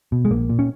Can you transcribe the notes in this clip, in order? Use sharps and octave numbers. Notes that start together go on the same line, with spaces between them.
B2
G#3
A#1 A#3
A#2
C#4